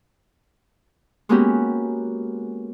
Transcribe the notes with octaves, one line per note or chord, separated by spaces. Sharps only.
G#3 A#3 B3 C#4 F#4 G4